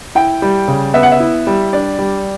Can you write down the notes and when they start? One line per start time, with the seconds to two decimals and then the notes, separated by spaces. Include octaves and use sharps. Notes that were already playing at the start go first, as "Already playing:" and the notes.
0.15 E4 G5
0.42 G3
0.68 C#3
0.94 B3 E5
1.03 F#5
1.12 E5
1.20 E4
1.47 G3
1.73 D4 D5
1.99 G3